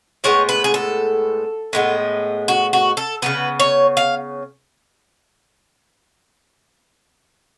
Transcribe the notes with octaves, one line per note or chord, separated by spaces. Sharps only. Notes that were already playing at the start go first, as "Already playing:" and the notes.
A2 G#3 B3 C#5
B4
G#4
A4
A2 G#3 B3
F#4
F#4
A4
C#3 F#3 B3 B4
C#5
F5